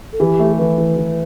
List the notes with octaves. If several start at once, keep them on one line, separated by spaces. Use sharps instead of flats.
A4
E3 G4
A3
A4
E3 B4
E3
E3